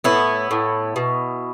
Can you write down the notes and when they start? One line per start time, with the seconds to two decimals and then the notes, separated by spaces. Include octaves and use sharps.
0.04 A2 B3 E4
0.51 A2
0.96 B2